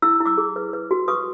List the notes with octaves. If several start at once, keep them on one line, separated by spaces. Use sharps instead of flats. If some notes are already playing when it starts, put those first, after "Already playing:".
E4 E6
E4
D6 E6
G#4
B4
B4
F#4
B4 C#6 D#6